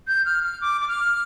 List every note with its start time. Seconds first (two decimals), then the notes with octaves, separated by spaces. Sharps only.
0.08 G6
0.26 F6
0.44 F6
0.62 D6
0.81 D6
0.88 F6